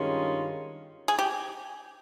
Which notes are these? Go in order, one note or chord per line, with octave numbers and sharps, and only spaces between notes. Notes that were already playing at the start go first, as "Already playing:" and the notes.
Already playing: G2 D#3 G#3 C#4 F4
G#4
G4